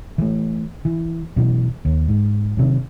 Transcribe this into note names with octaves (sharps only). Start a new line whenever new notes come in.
E3 A3
E3
F#2 B2 E3
D#2
G#2
F#2 C3 D#3